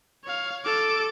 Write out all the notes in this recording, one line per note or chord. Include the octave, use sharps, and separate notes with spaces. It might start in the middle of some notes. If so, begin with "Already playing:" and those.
C#5 F5
A4 D6